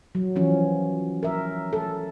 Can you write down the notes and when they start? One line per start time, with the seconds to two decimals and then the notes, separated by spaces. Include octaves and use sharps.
0.15 F#3
0.36 E3 F3 C#4
1.23 A#4 E5
1.73 A4